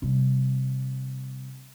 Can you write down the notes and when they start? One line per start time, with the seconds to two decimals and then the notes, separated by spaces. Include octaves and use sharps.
0.02 C3 G3